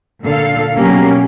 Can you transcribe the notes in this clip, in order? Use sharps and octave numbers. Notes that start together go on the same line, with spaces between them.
A#2 D3 A4 F5
B2 F#3 A#3 C#4 G4